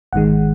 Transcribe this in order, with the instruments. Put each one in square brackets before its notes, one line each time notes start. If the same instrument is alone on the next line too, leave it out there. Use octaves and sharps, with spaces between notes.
[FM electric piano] G#1 G#2 D#3 G#3 F#5